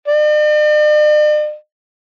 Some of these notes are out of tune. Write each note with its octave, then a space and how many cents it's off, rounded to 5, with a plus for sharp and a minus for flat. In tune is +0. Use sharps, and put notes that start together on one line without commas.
D5 +45